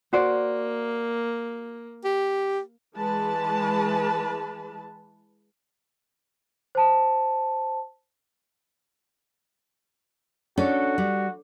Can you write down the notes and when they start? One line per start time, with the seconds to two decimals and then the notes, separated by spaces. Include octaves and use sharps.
0.13 A#3 F#4 C5 D5
2.04 G4
2.97 E3 G#3 B4 A5
6.75 C5 A5
10.58 C#4 D4 F#4 A4
10.98 G3